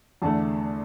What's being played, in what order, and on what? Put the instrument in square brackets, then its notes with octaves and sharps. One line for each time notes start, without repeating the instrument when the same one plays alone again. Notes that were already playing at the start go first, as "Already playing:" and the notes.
[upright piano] E2 D3 A3 A5